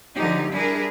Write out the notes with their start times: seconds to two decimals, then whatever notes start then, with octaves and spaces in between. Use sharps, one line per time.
0.15 D3 F3 F#3 D#4 G4
0.51 G3 D4 E4 G#4 A#4